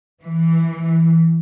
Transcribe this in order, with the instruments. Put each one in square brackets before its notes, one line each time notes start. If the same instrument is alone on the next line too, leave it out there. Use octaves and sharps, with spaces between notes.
[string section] E3